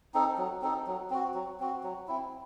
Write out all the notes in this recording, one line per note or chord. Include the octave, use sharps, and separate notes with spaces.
C4 D#4 A4
F#3
C4 D#4 A4
F#3
C4 F#4
F#3
C4 F#4
F#3
C4 E4